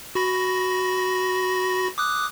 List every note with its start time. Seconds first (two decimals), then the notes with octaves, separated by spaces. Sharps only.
0.15 F#4 B5 A#6
1.98 D6 D#6 F#6